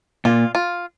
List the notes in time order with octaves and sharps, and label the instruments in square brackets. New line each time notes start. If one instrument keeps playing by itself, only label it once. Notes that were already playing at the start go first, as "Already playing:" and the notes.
[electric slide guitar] A#2 [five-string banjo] F4
[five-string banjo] F4